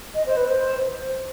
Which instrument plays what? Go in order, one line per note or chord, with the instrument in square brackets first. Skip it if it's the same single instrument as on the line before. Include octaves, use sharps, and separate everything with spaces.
[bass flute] D#5
C5
B4
C5